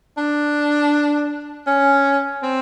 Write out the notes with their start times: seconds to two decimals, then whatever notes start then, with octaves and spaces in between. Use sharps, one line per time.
0.17 D4
1.67 C#4
2.43 C4